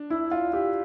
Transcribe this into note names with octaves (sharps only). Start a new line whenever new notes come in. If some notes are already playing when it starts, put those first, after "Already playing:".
Already playing: D4
E4
F4
G4